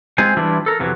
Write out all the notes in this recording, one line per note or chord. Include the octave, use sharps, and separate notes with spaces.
G#3 C4 F4 G#4 C5 G#5
E3 G3 D4 E4 F4
A4 A#4
F2 C3 E3 F#3